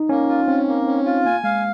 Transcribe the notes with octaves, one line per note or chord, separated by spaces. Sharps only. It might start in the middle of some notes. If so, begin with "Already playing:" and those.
Already playing: D#4
A#3 C#4
F4
C4 C#4
A#3
C4 C#4
F4
A#3 G#5
G#3 F5